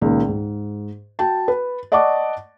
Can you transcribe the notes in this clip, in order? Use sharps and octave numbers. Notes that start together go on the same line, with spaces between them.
C#2 A#2 D#3
G#2
F#4 G5 A5
B4
D5 D#5 F#5 A5 C#6 D6